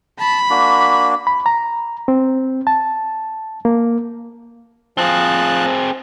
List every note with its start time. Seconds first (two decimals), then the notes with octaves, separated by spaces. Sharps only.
0.20 A5 B5
0.50 A#3 D4 F#4
1.27 B5
1.46 A#5
2.08 C4
2.67 A5
3.65 A#3
4.98 F3 C4 G#4 A5 F#6